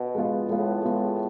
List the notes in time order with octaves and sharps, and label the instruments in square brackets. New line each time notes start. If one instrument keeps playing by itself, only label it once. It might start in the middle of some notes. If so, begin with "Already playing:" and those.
Already playing: [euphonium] B2
[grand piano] G#3 B3 F4
[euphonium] A2 [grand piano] G#3 B3 F4
[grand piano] G#3 B3 F4